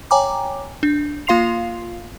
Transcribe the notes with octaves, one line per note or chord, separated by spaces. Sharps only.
C#5 G5 G#5 A#5 D6
D4
A#3 F4 F5 C6 C7 F7